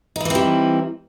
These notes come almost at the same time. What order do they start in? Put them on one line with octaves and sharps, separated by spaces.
D#4 E4 E3 C4 G3